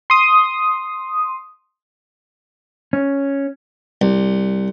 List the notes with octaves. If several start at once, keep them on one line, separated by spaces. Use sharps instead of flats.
C6 D#6
C#4
C2